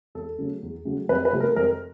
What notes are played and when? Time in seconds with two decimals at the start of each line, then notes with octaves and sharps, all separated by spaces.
0.15 E2 A4
0.38 C#3 F#3 A3
0.63 E2
0.85 C#3 F#3 A3
1.09 F2 B4
1.25 B4
1.33 C3 F3 A3
1.40 A#4
1.56 F2 A#4